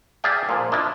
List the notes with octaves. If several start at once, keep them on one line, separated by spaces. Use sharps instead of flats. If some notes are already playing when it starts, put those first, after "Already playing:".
G#4 D5 E5 F5 G5
A#2 F3
D4 E4 F4 D#5